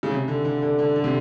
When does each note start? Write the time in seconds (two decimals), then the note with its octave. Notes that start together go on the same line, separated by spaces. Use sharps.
0.03 C#3
0.11 C3
0.28 D3
0.45 D3
0.62 D3
0.79 D3
0.96 D3
1.04 C3